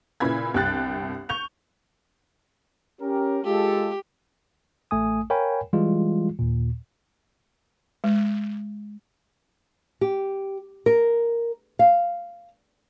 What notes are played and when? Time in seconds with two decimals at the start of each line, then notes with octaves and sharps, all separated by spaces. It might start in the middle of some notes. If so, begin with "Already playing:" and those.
0.20 A#2 C#3 E4 B4 B5 G#6
0.54 G1 C2 G4 G5 F#6 A6
1.29 C#6 G6 F7
3.01 C#4 G4 A#4
3.44 G#3 F4 G4 A4
4.91 A1 A3 G#5 D#6
5.30 A#4 C#5 F5 G5 G#5 B5
5.73 E3 G3 G#3 F4
6.39 D#2 A#2
8.04 G#3
10.01 G4
10.86 A#4
11.79 F5